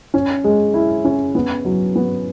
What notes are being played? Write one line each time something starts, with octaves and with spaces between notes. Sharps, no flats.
C#4
G#3
E4
C#4
B3
F#3
B3